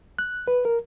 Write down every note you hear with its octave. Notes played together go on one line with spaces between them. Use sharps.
F#6
B4
A#4